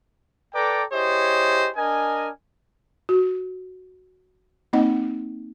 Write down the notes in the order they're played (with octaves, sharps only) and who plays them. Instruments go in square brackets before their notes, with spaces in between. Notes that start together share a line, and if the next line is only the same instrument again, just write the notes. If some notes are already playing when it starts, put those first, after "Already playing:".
[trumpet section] A4 B4 D5 G5 A#5 D6
E4 G4 G#4 C5 C#5 D#5
D4 A#4 D#5 G#5
[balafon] F#4
A#3 C4 D#4 D#5 F#5